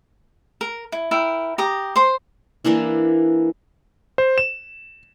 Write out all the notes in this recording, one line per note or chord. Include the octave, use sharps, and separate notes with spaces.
A#4
E4
E4 A#4 G5
G4 A#5 D#6
C5 C6
E3 A#3 D4 E4
C5
E7